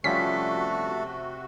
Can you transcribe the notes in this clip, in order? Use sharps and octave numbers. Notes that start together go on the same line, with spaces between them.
C3 F3 G3 A3 C#4 F#4 A4 B6